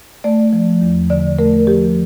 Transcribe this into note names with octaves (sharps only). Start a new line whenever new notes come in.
A3 D5
F3
E2
D3 D5
A3 A#4
F3 G4